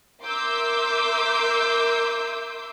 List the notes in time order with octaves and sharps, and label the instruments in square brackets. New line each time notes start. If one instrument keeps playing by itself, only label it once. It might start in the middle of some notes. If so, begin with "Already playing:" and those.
[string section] A#4 E5 C6 D6 E6 G6